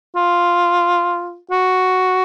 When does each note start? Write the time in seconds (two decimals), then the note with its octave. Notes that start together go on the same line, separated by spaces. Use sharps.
0.16 F4
1.51 F#4